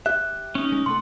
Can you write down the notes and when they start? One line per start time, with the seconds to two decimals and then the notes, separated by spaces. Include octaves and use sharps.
0.06 G4 E5 F#6
0.55 C#4 D#4
0.72 G#3
0.86 C3 A3 A4 F#5 C6